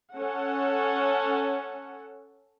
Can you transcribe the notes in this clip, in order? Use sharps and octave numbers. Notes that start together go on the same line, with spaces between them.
C#4 A4 F#5